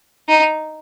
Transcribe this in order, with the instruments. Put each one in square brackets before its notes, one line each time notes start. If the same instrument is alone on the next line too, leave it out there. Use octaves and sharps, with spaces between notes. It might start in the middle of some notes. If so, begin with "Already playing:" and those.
[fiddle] D#4